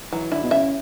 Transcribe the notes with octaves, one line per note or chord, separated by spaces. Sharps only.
E3 F#3
D3 E4
B2
C#3 E5